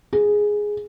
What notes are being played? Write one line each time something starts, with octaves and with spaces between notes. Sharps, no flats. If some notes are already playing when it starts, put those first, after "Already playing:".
G#4